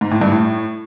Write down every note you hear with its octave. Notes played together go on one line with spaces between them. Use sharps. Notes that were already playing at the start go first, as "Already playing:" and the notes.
G#2
A2
G2
A2